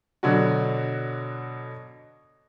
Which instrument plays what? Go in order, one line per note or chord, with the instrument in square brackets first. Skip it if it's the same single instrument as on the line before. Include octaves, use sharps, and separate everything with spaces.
[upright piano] B2 D3 F#3 D4 F#4